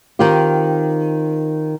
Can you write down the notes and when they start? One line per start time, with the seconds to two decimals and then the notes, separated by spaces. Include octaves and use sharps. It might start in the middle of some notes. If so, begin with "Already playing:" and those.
0.19 D#3 C4 F4 G4